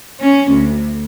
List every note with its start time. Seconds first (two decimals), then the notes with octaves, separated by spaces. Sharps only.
0.20 C#4
0.52 D2